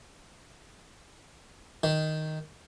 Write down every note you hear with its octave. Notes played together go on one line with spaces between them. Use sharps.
D#3